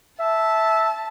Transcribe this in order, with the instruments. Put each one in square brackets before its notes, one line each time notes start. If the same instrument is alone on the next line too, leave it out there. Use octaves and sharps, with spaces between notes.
[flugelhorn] E5 [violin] A5